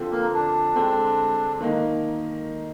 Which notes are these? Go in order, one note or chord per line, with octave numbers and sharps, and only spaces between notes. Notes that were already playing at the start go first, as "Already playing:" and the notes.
Already playing: D3 F3 C4
A#3
D4
D3 G#3 C4
D#3 A#3 D#4